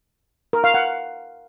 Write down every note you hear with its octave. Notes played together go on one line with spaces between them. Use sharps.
A#4
F5
F#5